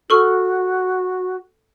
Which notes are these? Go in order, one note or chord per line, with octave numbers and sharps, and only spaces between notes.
F#4 A4 C#6 F6